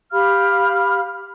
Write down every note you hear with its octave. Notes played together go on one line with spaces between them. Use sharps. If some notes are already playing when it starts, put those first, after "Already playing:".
G4 F5 B5 F6